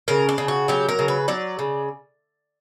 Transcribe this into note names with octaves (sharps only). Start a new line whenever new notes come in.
C#3 A#4
D4
C#3
F#4
F#3 G4
A#4
C#3
B4
F#3 D5
C#3